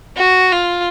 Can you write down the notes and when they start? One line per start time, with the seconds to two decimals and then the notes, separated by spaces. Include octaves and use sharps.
0.17 F#4
0.52 F4